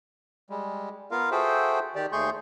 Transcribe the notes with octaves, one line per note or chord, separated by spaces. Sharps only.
G3 G#3
B3 F4 A#4 F5
F#4 G#4 A4 C5 E5 G5
D#3 G4 D5
D#2 A3 G#4 C6 C#6 G6